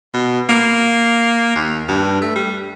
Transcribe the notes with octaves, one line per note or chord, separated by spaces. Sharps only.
B2
A#3
D#2
G2
A3
G3